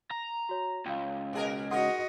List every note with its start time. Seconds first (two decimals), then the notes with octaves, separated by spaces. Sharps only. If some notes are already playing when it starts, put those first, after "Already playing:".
0.11 A#5
0.49 F#4 C#5
0.86 C#2 F5 G5
1.33 B2 G#4 A#4
1.71 D#4 F#4 A#4 D#5 F#5 C6 D#6